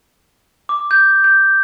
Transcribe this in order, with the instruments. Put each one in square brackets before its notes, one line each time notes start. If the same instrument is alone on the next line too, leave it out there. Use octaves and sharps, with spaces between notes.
[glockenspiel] D6
G6
G6